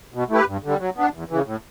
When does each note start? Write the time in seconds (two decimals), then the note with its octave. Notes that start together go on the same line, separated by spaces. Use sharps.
0.14 B2
0.30 A3 E4 G4 B4
0.47 G2
0.64 D3 G3
0.80 F#3
0.97 B3 D4
1.14 E2
1.30 C#3 E3
1.46 A2